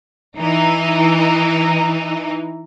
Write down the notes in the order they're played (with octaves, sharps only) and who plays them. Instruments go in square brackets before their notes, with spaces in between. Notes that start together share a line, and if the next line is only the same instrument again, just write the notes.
[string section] E3 D#4